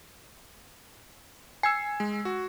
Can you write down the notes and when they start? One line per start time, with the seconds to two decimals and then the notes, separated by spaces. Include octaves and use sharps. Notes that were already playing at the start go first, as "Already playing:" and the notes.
1.63 G#5 E6 G#6 C7
2.00 G#3
2.25 F#4